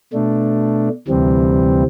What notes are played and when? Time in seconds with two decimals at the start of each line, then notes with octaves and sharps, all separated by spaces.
0.13 B2 A3 D4
1.08 D2 C3 E3 G3 C4